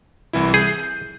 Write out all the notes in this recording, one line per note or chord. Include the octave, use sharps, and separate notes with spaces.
C2 E3 E4
G#4 G6